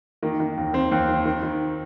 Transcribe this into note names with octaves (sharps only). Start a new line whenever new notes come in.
D#3 A#3
D#3
D#2
D#3 C4
D#2
D#3
D#3
D#3